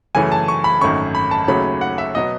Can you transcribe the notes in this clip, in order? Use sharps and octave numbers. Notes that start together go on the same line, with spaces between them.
F#2 C#3 E3 A3 C#4 G#5
A5
C#6
B5
G#1 F#2 D#3 A3 C#4 C#6
B5
A5
D#2 C#3 F#3 A3 C#4 B5
F#5
E5
B2 F#3 B3 D#5